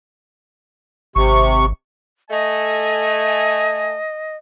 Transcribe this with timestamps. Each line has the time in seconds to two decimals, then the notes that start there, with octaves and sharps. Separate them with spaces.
1.16 G#1 C3 C#6
2.30 A3 D#5 G#5